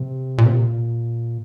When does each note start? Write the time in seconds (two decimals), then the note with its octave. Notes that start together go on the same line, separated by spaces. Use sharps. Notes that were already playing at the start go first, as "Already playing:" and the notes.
Already playing: C3
0.38 A#2
0.46 C3
0.53 A#2